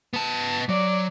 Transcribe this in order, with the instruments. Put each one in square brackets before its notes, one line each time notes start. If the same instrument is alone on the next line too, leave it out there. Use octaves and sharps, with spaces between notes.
[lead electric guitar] B3 A5
[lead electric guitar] F#3 [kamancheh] D5